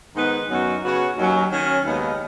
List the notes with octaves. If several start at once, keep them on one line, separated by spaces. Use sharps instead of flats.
G#2 D#3 B3 D#4 B4
F#2 F#3 B3 D#4 F#4
C#3 B3 F#4 C#5
D#2 D#3 F#3 C#4
D#3 F#3 C#4
D#2 C#3 G#3 B3 D#4